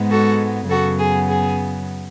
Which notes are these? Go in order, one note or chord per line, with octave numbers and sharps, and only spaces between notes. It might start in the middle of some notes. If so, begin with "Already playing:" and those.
Already playing: G#2 G#3 B3
F#4 A4
F#2 C#3 F#3 B3 F#4 A4
G#4
G#4